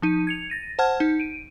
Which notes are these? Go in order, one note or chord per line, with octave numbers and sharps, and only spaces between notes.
F3 D#4 D#7
G#6 C#7 F7
A6 A#6 D#7
C5 F#5 A5 F6 G#6
D#4
D7 D#7